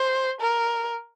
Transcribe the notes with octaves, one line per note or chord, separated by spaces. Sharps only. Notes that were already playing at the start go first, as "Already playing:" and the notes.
Already playing: C5
A#4